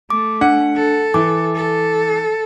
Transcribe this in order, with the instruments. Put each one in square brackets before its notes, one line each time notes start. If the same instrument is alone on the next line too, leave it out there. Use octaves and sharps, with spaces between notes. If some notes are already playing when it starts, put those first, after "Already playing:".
[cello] A3 [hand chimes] D6
[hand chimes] D4 [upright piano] F#5
[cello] A4
[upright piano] E3 [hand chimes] D6
[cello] A4